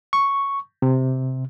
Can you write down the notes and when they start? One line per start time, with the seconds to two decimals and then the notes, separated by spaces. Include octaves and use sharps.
0.13 C#6
0.82 C3